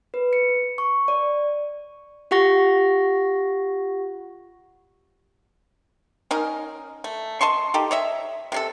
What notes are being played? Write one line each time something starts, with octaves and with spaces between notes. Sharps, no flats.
B4
C#7
C#6
D5
F4 G4 F#5 C#6 A#6
C#4 D#4 A#4
A3
D#5 A5 C6 C#6
D#4 G4 A4
C#5 D#5 E5
C3 C#4 A4